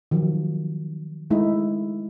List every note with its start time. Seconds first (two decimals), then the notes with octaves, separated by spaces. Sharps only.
0.11 D#3 F3 F#3
1.30 G#3 A3 D#4 E4